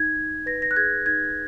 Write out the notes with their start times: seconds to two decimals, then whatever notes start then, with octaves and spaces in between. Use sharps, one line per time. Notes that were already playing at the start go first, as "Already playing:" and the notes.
Already playing: D#4 G#6
0.17 D#4
0.46 B4 A#6
0.62 A#6
0.71 F#6
0.76 G#4 G#6
1.06 D#4 G#6